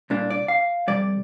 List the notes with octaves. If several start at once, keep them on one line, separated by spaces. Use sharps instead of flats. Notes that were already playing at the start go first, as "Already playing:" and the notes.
C2 A#2 A#3 D4
D5
F5
F2 C3 G3 D5